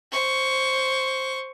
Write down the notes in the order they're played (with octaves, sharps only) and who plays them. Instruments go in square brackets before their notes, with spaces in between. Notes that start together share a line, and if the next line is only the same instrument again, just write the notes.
[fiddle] C5 C#6